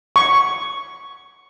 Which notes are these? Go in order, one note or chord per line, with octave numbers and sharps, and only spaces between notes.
C#6